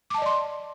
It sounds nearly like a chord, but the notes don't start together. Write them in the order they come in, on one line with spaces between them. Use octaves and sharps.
D6 A5 D#5 D5 C6